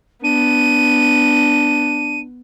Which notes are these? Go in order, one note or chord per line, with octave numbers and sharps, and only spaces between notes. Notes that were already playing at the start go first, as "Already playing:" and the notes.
B3 D4 D#7